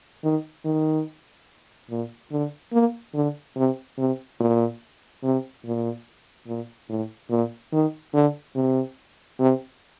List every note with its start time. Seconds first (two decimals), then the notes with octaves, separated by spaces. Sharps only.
0.24 D#3
0.65 D#3
1.90 A#2
2.32 D3
2.73 A#3
3.14 D3
3.56 C3
3.98 C3
4.40 A#2
5.23 C3
5.65 A#2
6.47 A#2
6.90 A2
7.30 A#2
7.72 D#3
8.14 D3
8.55 C3
9.39 C3